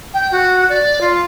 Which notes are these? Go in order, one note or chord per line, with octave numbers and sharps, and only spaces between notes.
G5
F#4
D5
F4